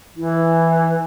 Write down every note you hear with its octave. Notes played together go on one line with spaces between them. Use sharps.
E3 E4